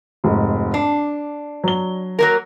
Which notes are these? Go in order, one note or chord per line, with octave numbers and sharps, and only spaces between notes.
F1 G#2
D4 C7
F#3 G7
F#3 A#3 A#4